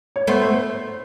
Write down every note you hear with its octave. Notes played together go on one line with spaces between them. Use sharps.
C#5
A3 B3 C5
C5